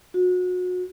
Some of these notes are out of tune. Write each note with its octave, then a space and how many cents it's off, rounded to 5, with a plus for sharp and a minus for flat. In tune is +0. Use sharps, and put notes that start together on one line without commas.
F#4 -30